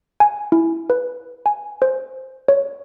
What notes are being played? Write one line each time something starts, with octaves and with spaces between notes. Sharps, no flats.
G#5
E4
B4
G#5
C5
C#5